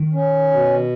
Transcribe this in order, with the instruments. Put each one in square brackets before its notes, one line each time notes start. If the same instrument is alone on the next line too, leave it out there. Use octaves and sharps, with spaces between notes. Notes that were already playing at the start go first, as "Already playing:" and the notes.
Already playing: [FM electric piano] D#3
[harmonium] C#4
B2